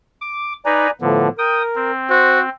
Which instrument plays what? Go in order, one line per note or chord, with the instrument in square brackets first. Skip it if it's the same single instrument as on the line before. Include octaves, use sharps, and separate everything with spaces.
[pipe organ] D6
[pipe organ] D#4 B4 [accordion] D5 G#5 A#5
[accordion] A2 F3 B3 [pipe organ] D3
[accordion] A#4 [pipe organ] G5 D#6
[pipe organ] C4
[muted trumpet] F#4 [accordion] C5